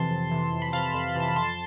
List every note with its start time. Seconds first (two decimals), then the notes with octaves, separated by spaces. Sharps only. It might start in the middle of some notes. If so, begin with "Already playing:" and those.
Already playing: F2 C3 E3 A5 C6
0.11 F2
0.31 C3 E3
0.53 F2
0.62 B5
0.73 C3 E3 F5 A5
0.94 F2
1.15 C3 E3 A5
1.28 B5
1.36 F2 A5 C6